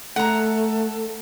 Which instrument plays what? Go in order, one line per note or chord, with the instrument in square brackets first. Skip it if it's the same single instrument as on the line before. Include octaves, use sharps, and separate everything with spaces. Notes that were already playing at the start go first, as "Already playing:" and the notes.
[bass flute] A3 [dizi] A4 [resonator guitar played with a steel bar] F#5 A#5